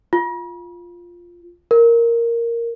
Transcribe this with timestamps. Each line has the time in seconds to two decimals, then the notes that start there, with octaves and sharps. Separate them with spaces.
0.13 F4
1.71 A#4